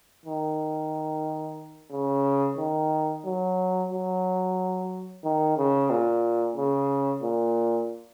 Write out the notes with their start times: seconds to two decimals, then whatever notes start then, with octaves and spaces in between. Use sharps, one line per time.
0.26 D#3
1.92 C#3
2.58 D#3
3.25 F#3
3.91 F#3
5.24 D#3
5.57 C#3
5.90 A#2
6.56 C#3
7.23 A#2